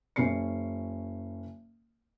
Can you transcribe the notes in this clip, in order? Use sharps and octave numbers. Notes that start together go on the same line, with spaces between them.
F#1 C#4 C7 C#7